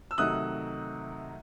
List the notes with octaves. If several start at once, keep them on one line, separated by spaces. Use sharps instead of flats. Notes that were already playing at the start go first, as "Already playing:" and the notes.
E6
C3 D#3 F#3 A3 D#4 D#6 F#6